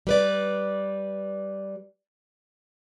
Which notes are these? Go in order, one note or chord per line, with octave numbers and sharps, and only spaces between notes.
G3 B4 D5